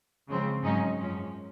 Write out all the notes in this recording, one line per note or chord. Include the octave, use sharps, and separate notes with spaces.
C#3 F3 G#3 C4
G#2 F#3 C#4 D#4 D#5
F#2 F3 G#3 C#4